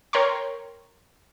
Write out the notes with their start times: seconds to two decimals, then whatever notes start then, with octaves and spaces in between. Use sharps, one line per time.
0.13 A#4 C#5 G5 A#5 C6 C#6